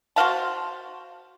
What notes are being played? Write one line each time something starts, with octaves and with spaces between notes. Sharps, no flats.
F#4 C5 F5 A5